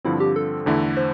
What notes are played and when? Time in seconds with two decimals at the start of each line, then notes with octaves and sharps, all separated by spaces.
0.05 G2 D3 F3 C4 E4
0.20 G4
0.36 A4
0.66 E2 D3 A3 E4
0.97 C5